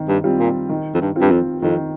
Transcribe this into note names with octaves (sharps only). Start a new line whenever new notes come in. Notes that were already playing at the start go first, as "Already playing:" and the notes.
Already playing: D#3 C4
G2
G3 C4 F4
A#2
D#3
F2
G2
C4 F4
G2
F2
F2 D#3